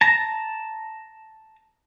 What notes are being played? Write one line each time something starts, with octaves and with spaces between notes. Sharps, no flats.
A5 A#5